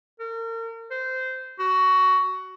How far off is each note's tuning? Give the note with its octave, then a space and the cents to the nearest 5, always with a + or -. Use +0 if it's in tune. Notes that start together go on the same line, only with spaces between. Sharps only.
A#4 -40
C5 -15
F#4 +15